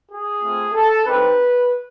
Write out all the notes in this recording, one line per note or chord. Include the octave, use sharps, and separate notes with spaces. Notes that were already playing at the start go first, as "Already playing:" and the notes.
G#4
A3 C4 F4
A4
C4 D#4 G4 B4